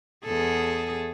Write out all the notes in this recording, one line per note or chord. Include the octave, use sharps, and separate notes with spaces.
E2 G#4 A4